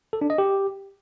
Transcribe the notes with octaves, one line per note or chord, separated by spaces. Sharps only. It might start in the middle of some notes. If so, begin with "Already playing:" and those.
A4
D4
D#5
G4